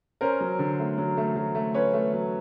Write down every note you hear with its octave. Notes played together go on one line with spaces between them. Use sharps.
C#4 A#4 C5
F#3
D3
A3
F#3
A3
F#3
A3
C#4 B4 C#5
A3
F#3